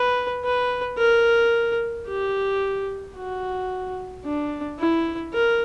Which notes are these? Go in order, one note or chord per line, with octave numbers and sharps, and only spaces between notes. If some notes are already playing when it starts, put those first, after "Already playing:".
Already playing: B4
B4
A#4
G4
F#4
D4
E4
A#4